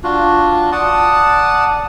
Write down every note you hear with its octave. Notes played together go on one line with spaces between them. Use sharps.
D4 F4 F#4
D5 F#5 A5 D#6